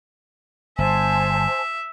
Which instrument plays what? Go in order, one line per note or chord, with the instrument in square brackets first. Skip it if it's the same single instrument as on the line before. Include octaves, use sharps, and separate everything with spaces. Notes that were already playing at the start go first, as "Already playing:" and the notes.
[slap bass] G1 [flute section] C5 G#5 A5 [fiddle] E5